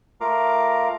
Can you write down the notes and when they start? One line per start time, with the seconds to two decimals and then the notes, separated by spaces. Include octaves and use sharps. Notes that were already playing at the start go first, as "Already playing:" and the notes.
0.21 A3 F4 A#4 F5 A#5 D6